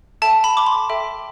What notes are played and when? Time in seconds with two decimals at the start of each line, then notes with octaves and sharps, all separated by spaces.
0.22 A4 E5 G5 A5
0.44 B5
0.57 D6
0.67 C6
0.90 A4 E5 G5